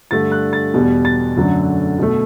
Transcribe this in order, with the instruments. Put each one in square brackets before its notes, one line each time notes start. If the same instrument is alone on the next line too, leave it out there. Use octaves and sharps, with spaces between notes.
[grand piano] G2 D3 A3 A6
F#6
A6
E2 B2 G3
A6
F#2 D3 F#3 A3
B2 A3